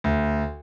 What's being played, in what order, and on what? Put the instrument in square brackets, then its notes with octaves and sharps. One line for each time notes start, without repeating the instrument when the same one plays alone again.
[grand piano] D2